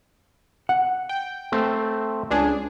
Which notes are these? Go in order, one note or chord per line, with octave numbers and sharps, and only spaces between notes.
F#5
G5
A3 C4
C#2 D4 G#4